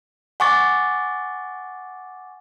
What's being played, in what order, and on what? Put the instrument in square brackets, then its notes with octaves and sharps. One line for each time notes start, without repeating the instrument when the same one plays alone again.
[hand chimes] F#5 G#5 C#6 D6 A6